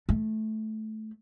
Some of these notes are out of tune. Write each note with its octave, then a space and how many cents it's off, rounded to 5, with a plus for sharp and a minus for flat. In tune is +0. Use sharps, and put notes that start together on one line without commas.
A3 -15